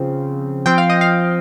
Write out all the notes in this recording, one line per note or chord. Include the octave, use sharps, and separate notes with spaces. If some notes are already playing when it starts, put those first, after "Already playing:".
Already playing: C#3 F3 C4
F3 C4 G5
F5
D#5
F5